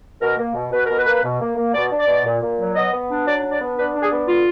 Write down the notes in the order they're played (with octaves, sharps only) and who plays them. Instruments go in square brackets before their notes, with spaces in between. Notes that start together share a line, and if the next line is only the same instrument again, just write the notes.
[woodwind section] B2 A#4
A#3
B2
B2 B4
B2 A#4
B4
A#3
B2
A#3
A#3
B2 D5
D4
D5
B2
A#2
A#2
F#3
B3 D#5
B3
D4
F#3 D5
D4
D5
B3
D4 B4
D4
G#4
B3
D3 F4